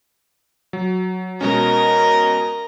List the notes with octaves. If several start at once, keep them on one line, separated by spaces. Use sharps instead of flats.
F#3
B2 G#3 C#4 A#4 D#5